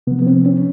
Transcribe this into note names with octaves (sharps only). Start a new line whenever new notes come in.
C3 F3 B3
B3
C4
C#4